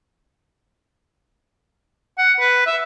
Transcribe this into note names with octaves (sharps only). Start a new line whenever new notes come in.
F#5
B4
E5